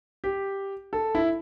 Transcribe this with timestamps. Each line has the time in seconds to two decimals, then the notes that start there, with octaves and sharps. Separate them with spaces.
0.24 G4
0.93 A4
1.15 E4